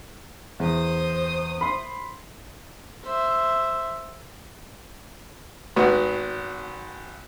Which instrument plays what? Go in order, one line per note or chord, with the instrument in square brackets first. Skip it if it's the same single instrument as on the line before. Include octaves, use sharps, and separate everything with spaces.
[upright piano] E2 [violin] C5 D#6
[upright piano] B5 C6
[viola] C5 E5
[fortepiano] G#1 B3 F#4